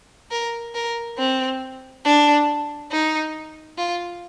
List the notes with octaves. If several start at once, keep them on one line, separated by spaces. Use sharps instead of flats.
A#4
A#4
C4
D4
D#4
F4